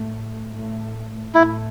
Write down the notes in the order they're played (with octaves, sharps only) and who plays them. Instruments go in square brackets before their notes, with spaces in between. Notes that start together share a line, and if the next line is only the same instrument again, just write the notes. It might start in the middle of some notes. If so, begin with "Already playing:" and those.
Already playing: [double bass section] A2 A3
A2 A3
[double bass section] A2 A3 [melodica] E4